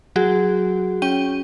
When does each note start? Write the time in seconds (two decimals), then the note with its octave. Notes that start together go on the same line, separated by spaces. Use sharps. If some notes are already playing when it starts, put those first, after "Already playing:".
0.16 F#3 F#4 G#4
1.02 C#4 G5 D#7